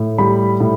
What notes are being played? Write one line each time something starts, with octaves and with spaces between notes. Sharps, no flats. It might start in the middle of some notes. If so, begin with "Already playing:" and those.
Already playing: A2
G3 B5
A2